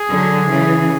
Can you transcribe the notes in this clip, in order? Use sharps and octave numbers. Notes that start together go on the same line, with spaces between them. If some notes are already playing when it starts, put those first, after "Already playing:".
Already playing: G#4
D3 F#3
C#3 E3